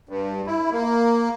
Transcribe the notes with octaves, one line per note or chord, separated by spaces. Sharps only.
G2
E4
A#3